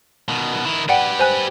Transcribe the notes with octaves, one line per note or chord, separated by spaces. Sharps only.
B2 D#3
D#3 E4
G4 B4 D5 F#5 G5
C5 G#5 F#6